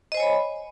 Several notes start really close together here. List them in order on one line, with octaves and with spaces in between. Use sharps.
D#5 C5 G#5 C#5 B5